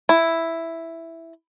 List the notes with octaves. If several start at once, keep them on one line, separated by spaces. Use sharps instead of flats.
E4